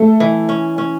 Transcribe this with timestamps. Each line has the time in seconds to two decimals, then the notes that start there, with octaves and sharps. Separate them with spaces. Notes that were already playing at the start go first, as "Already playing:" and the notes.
Already playing: A3 A4
0.20 E3
0.49 C#4
0.78 C#4